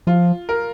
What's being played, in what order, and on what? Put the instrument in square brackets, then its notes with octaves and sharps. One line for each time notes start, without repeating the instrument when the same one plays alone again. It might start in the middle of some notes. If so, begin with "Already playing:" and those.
[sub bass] F3 [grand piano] F4
[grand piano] A#4